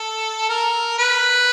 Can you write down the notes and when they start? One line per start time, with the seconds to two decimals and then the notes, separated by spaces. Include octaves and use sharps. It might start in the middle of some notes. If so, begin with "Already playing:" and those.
Already playing: A4
0.49 A#4
0.98 B4